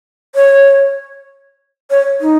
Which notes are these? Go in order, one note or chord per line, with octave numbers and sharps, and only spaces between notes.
C#5
C#5
D#4